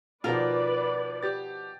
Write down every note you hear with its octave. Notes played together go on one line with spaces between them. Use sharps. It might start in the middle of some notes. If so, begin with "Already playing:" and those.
B2 D#3 F3 F4 A#4 B4 D5
G4 A6